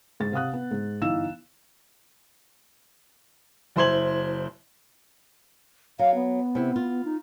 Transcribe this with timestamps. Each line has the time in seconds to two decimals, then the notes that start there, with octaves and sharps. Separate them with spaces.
0.20 G#2 A6
0.32 C3 F5 F#5 D#6 F#6
0.53 B3
0.71 G#2
1.01 G1 E3 D#4 F5 E6 E7
3.76 F#1 E4 C5 C6 G#6 F#7
5.99 F#3 F5
6.15 B3
6.55 C3 E4
6.76 F4
7.05 D#4